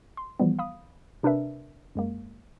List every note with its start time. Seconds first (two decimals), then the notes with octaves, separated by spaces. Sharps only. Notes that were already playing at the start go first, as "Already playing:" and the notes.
0.17 C6
0.40 E3 F3 G3 B3
0.59 F5 B5 D#6
1.23 C3 D4 A#4 B4 E5
1.95 F#2 G#3 A#3